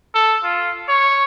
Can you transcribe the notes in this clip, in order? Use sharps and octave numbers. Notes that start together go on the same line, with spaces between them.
A4
F4
C#5